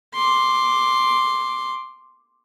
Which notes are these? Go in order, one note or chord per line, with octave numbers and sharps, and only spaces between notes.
C6 D6